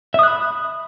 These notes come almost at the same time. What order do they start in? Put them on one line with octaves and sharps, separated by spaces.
E5 D#6 F#6 B5